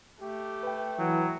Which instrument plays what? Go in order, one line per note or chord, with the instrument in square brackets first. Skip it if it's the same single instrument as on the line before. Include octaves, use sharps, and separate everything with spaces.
[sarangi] A3 [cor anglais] G4
[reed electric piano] B4 G5
[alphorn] E3 [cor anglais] F#3